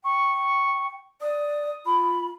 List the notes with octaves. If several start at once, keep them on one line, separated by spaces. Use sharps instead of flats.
G5 C#6
D5 D#6
F4 B5